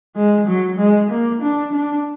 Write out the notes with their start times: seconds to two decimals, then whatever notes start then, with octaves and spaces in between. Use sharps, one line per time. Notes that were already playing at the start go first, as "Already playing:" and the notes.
0.16 G#3
0.47 F#3
0.78 G#3
1.10 A#3
1.42 D4
1.73 D4